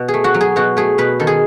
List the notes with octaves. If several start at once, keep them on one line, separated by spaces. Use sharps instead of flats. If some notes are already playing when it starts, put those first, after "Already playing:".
Already playing: B2
G#4
A3
F#4
F#3
G#4
B2 F#4
A3 G#4
B2 B4
D#3 A4
G#4